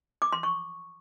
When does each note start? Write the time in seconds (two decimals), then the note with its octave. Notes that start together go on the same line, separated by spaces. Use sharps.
0.22 D6
0.32 C6
0.43 C#6